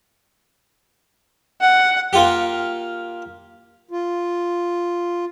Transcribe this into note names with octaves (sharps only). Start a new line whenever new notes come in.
F#5
A#3 F4 G4
F4